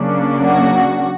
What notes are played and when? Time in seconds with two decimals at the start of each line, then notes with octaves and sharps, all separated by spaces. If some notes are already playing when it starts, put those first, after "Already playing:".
Already playing: C#3 F#3 A#3 D4
0.43 F#4